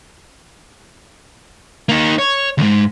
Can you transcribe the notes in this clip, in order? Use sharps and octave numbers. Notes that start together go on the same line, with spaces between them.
A#3 D#4
C#5
D2 G#2